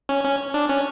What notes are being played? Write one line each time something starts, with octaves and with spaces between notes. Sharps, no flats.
C#4
C#4
D4
C#4